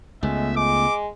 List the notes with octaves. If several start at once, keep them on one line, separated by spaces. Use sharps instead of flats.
C#2 G#3 A3 B3 E5
G#3 D6